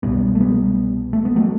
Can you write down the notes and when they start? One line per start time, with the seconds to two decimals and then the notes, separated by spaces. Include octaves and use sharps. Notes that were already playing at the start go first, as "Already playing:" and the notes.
0.03 C2 B2 G3 B3
0.35 A3
0.40 G3 B3
1.13 A3
1.25 B3
1.36 F#3 A3